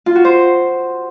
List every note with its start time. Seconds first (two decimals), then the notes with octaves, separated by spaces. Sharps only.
0.06 F4
0.15 F#4
0.25 C5